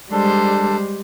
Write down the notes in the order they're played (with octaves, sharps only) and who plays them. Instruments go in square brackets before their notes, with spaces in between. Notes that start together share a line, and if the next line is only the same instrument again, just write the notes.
[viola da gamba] G3 G#3 C5 [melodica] D4 A4